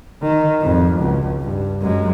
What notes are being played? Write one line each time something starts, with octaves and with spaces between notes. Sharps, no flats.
D#3
G#1 F2
C#2
G2
F#2 G#3